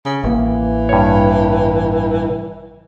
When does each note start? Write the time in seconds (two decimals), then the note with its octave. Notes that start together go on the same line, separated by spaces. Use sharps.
0.05 C#3
0.24 A1 E3 A#3
0.89 G2 C#5